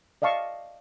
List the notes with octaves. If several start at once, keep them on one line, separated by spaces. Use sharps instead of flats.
D5 D#5 F5 A5 C#6